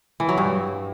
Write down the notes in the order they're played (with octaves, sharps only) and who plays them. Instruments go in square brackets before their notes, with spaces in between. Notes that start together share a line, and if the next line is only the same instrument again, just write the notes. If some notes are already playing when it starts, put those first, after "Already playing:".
[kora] E3
F#3
G2